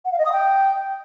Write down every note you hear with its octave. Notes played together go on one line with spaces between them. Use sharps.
F#5
F5
D#5
D#6
G5